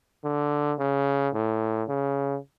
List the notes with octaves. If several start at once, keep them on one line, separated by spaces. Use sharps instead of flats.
D3
C#3
A2
C#3